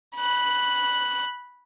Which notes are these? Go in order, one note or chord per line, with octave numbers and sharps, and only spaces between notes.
B5 F#6